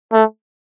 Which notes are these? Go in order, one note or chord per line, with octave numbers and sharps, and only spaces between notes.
A3